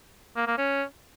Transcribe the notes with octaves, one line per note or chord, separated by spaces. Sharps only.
A#3
A#3
C#4